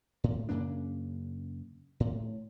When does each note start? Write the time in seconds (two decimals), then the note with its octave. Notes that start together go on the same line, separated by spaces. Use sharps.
0.24 A2
0.49 F#2 C#3 A#3 D4
2.00 A2